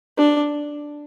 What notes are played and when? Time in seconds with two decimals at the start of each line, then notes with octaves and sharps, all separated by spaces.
0.18 D4